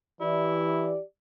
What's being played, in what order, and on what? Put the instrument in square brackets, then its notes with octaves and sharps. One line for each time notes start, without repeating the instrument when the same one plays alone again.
[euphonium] E3 [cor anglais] E4 [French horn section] G4 D5